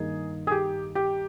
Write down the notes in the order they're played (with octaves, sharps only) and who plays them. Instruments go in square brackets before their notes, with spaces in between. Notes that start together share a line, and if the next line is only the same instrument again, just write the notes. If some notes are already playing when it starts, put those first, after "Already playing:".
Already playing: [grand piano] G2 D#3 A#3 D#4 A#4 [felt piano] G#4
[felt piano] G#4
G4
G4